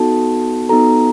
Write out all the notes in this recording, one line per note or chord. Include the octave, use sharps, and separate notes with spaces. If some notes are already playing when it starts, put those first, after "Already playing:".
Already playing: B3 D#4 F#4 A4 A5
B3 D#4 F#4 A4 A#5